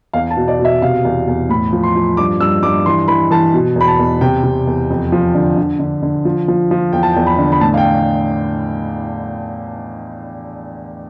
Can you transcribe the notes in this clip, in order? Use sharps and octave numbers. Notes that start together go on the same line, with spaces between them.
E2 F5
A5
B2
D5
B2
E5
C3 F5
E2
E2
A2 B5
F3
C6
F3
G2 D6
G2 E6
G2 D6
E3 C6
E3 B5
E3 A5
B2
E2 B5
A5
E2
C3 G5
C3
E2
F2
F3
D3
D3
D3
D3
F3
F3
F3
E2 G5
A5
G5
E2
B5
D3
B5
A2 A5
F5
G5